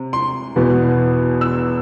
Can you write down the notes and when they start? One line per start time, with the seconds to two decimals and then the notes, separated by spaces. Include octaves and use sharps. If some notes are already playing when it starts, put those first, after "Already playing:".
Already playing: C3
0.13 C6
0.56 E2 B2 B3
1.41 E6